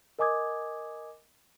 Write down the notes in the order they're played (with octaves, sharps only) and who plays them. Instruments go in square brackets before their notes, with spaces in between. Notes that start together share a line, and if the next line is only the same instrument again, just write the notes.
[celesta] A#4 D#5 G#5 D6 D#6 G#6